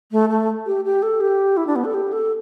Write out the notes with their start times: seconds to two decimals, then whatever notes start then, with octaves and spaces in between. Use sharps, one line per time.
0.12 A3
0.29 A3
0.66 G4
0.85 G4
1.03 A4
1.21 G4
1.57 E4
1.67 D4
1.76 B3
1.85 A4
1.94 G4
2.12 A4